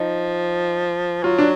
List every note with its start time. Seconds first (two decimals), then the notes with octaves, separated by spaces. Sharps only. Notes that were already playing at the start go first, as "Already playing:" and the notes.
Already playing: F3 D#4
1.24 F#3 F4
1.38 D4